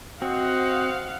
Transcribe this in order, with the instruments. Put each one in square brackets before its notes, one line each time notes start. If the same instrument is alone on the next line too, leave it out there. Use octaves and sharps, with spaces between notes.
[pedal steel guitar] C4 [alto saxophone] F#4 [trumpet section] C5 D#5 [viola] F5 F#5